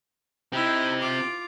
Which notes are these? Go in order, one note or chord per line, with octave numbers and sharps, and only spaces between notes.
C4 D#4 E4 G4
F4 D6